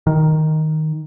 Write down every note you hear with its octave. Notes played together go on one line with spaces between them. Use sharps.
D#3